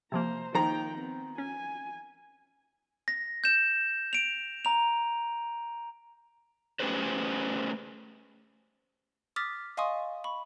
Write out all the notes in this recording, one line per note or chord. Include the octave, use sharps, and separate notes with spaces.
C3 F3 A#3 C5 A#5
D#3 F3 A#3 G5 A#5
B3 C4
C#4 G#5
A#6
G6 E7
D7 F7
A#5 F7
A3 C#4 G4 G#4 B4 C5
D6 D#6 F6 A6 B6
D#5 F5 G#5 C6 C#6 D#6
B5 C#6